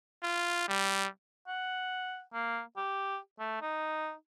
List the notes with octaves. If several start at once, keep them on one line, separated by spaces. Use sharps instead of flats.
F4
G3
F#5
A#3
G4
A3
D#4